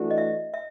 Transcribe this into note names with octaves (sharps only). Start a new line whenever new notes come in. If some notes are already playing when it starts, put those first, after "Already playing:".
Already playing: E3 A3 D4 F#4
D#5
E5
E5